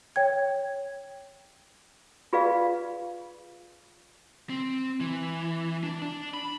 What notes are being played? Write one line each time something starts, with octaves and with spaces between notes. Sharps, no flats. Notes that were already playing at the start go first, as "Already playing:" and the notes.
C#5 G5 G#6
F4 G#4 B4 D5 F5
C4
E3
D4
D4
B5